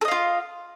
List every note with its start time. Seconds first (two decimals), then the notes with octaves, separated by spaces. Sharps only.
0.01 A4
0.05 D#5
0.08 F5
0.11 F4